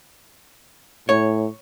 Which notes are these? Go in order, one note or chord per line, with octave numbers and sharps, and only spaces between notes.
A2 C#5